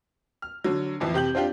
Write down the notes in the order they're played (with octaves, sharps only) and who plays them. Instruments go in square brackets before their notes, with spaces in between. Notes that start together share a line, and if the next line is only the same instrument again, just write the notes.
[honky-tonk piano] F6
D3 F#3
A1 F2 E3
C3 G4 G6 F#7
C4 D4 F4 G4